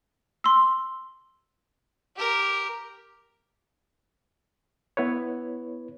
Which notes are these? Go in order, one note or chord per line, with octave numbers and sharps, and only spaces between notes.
C6 E6
G4 A#4
B3 E4 B4 C#5